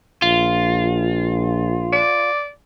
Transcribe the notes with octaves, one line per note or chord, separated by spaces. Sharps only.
A#1 F4
D5